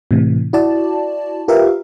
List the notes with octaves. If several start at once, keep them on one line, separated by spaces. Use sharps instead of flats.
A2 C3 E3
E4 F#4 D5 A5
F4 G4 A#4 B4 E5 F5